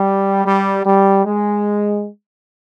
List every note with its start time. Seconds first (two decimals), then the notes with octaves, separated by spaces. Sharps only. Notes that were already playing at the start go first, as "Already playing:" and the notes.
Already playing: G3
0.45 G3
0.85 G3
1.25 G#3